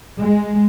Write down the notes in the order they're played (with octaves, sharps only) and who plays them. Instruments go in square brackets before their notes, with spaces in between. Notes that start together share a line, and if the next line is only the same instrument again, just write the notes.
[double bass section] G#3